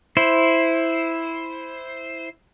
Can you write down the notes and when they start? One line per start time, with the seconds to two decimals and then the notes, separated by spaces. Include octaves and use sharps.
0.17 E4 C5